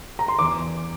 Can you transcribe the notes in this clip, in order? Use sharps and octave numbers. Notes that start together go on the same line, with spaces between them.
A#5
C6
E2 D6